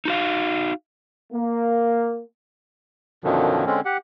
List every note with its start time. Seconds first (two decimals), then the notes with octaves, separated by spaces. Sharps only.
0.05 D#4 F#4 F5
1.33 A#3
3.24 F#2 B2 D3 D#3 F3 F#3
3.66 D3 G#3 C4 C#4
3.85 G4 F#5